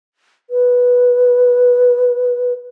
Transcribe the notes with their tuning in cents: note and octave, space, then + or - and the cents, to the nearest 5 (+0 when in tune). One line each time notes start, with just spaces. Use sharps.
B4 -10